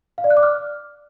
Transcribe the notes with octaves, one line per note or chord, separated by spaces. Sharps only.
F5
D5
F#6
D6
F6